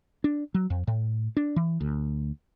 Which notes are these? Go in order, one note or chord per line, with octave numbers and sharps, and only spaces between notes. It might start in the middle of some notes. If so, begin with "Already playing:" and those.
D4
F#3
F2
A2
D4
E3
D2